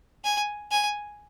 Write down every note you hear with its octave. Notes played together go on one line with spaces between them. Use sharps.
G#5
G#5